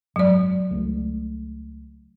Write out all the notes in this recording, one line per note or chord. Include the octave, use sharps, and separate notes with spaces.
G#1 F#2 F#3 D5
C#2 A3